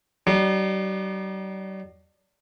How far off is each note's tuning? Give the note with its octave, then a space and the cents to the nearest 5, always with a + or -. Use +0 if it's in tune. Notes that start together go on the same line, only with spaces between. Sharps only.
G3 -45 D4 +45